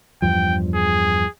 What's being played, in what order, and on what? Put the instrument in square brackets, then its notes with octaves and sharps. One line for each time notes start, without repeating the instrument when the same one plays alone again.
[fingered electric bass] E2 G2 F3 [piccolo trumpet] G5
[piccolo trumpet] G#4